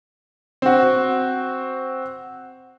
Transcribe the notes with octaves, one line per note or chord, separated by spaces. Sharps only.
C4 F#4